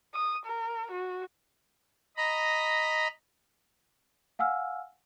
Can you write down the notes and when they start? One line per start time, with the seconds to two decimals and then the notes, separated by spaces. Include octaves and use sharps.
0.14 D#6
0.46 A#4
0.91 F#4
2.17 D#5 A#5 B5
4.39 F5 F#5 G#5 E6 F6